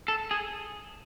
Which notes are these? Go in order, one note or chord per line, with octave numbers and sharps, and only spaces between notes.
A4
G#4